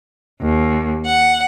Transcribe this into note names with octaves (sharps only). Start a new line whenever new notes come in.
D#2
F#5